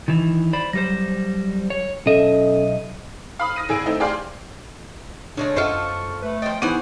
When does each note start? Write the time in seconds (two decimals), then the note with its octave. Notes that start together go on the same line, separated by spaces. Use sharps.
0.08 D#3 E3
0.53 C5 D5 B5
0.73 F#3 G3 C5 A#6
1.70 C#5
2.06 B1 C#4 A4 D#5 E5
3.39 F5 B5 D#6
3.56 D#6 A#6 D#7
3.69 G#1 G#4 E6 D7
3.86 A3 C4 D#4 E4
4.00 G4 G#4 D5 F5 C6
5.37 C#3 G#3 A3 D4
5.56 F#2 F4 A4 C5 D#5 E5 F#5 C#6
6.22 A3 B4
6.42 F3 D#5 G5 A6
6.62 E3 B3 D#4 E4 G#4 C5 F#5